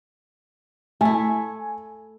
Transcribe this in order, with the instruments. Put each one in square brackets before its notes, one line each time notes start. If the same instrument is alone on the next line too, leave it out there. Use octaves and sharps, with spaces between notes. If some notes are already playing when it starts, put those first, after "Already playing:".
[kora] A3 E4 [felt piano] G#5